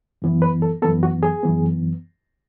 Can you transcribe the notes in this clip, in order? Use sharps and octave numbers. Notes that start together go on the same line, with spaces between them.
F#2 E3 B3
B4
A4
F#2 E3 B3 A4
F#4
G#4
F#2 E3 B3